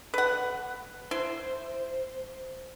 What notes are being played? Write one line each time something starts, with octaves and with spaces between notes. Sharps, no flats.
B4 F#5
E4 C5